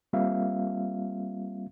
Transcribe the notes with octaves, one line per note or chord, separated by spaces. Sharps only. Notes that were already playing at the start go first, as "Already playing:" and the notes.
G3 A#3 C4 F4 E5 F5